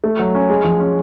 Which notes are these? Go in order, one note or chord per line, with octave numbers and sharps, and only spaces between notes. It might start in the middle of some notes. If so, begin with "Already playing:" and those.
A3
F#3
C#4
G#3
F3
C#4